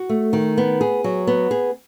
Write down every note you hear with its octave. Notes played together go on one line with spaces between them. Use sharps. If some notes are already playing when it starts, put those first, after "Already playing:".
Already playing: F#4
A3
D#3
B3
G#4
F#3
B3
G#4